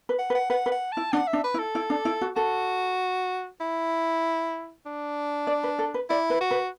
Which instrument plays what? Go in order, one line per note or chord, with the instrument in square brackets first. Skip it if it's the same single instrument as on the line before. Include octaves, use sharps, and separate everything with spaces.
[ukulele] B4
[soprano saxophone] F#5
[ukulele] B4
[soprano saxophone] F#5
[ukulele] B4 [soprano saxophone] F#5
[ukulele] B4
[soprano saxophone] F#5
[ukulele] E4 [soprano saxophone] A5
[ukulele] D4 [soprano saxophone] F#5
[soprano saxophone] E5
[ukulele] D4
[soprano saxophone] B4
[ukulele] E4
[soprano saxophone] A4
[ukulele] E4
D4
E4
F#4
[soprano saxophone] F#4 [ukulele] A4
[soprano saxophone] E4
D4
[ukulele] D5
B4
A4
B4
[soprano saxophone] E4 [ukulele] D5
[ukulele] B4
[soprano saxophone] F#4
[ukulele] B4